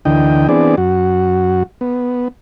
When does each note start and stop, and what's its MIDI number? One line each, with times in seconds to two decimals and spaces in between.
0.05 0.47 38
0.05 0.47 50
0.05 0.47 52
0.05 0.47 75
0.05 0.47 79
0.49 0.76 52
0.49 0.76 59
0.49 0.76 60
0.49 0.76 62
0.49 0.76 68
0.49 0.76 74
0.77 1.63 42
0.77 1.63 66
1.81 2.28 59